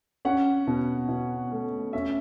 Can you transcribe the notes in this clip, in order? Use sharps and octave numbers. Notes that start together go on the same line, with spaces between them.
C#4 F#5
B2
B2
A3
C#4 E5